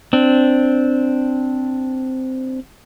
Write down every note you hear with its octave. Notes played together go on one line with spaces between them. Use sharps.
C4 D4